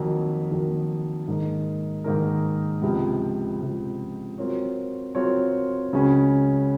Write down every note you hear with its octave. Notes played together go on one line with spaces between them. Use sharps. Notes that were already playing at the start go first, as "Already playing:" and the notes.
Already playing: F2 D#3 F#3 A#3
F2 D#3 F#3 A#3
G#2 D#3 A#3 D#4 A#4
G#2 D#3 A#3 D#4 A#4
C#2 C3 F3
C#2 C3 F3
F#3 C4 F4 A#4 C#5
F#3 C4 F4 A#4 C#5
C#2 C#3 F#3 C#4